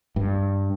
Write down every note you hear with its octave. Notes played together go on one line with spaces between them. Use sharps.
G2